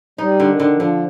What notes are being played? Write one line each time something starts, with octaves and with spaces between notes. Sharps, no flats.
G3 D#4
D3
D#3
D3
F3
D3